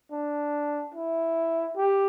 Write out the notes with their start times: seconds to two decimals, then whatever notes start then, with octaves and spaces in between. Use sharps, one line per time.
0.12 D4
0.95 E4
1.77 G4